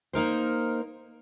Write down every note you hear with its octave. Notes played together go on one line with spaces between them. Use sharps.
A#3 D#4 A#4 C5